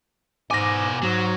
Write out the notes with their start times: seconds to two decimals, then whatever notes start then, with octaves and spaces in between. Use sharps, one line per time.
0.51 G#2 B2 G#5 D6 A#6
1.02 G#2 F#3